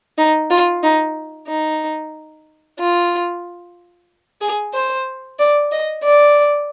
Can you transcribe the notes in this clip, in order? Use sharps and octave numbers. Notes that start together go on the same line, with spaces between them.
D#4
F4
D#4
D#4
F4
G#4
C5
D5
D#5
D5